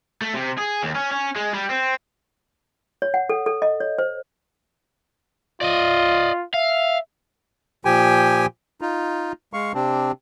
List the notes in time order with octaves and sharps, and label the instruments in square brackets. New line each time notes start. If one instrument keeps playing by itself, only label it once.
[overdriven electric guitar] A3
C3
G#4
D#2
C#4
C#4
G#3
G3
C4
[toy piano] C#5
F#5
A4
A4
D#5
C#5
C5
[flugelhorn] F4 [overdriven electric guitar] D5 D#5
[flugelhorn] E5 [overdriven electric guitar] F5
[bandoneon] A#2 F3 G4 G5 G#5
D#4 F4
G#3 F5 C#6
C3 C4 D4